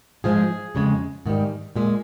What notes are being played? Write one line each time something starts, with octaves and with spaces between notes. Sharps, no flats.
G#2 F3 G#3 G#4
F2 C#3 G#3
G#2 D#3 G3
A#2 G#3